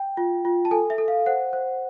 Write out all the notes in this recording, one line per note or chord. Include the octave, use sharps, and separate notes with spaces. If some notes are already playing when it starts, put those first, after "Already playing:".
Already playing: G5
F4
F4
A5
A4 G#5
E5
A4
F5
C5 F#5
C5